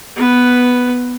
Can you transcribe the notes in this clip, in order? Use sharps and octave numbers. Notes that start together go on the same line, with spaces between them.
B3 B4